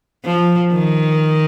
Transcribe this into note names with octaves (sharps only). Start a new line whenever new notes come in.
F3
D#3